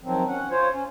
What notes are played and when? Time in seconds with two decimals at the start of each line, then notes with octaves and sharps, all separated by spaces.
0.03 D#3 F3 F#3 C4
0.28 C#4 F#5
0.51 F4 C5 C#5
0.73 C#4